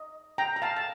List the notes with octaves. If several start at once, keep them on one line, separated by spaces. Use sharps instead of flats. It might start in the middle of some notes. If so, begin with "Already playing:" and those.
Already playing: D#5
G5 A#5
A#5
F5 A5
A5